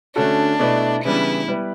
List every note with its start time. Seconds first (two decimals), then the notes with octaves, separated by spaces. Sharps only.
0.16 D3 A3 C#4 D4 F#4 A4
0.59 B2 A3 E4 B4 D5
1.04 C#3 E3 G3 B3 D4 E4
1.48 G3 B3 E4 B4